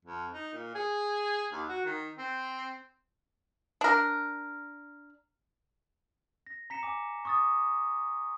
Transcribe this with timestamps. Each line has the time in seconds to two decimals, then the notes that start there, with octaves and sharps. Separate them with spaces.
0.05 F2
0.33 D#4
0.53 A#2
0.75 G#4
1.53 D#2
1.69 F#4
1.85 D#3
2.18 C4
3.81 D4 A#4
6.47 A#6
6.70 A#5 B6 C#7 E7
6.83 G#5 D6
7.25 C#6 D#6 A6